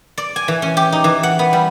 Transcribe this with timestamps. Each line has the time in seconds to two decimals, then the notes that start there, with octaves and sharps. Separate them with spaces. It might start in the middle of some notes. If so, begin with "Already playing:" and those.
0.18 D5
0.36 G#5
0.48 E3
0.62 C#4
0.77 G4
0.92 D#4
1.04 E3
1.23 F#5
1.39 B3
1.53 G3